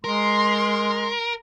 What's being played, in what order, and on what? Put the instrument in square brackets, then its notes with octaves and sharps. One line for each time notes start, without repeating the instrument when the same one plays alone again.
[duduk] G#3 [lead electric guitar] A#4 [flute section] C6